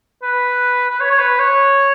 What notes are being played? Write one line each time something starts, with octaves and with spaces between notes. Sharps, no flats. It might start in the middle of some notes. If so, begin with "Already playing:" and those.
B4
B4
C#5
C#5
B4
C#5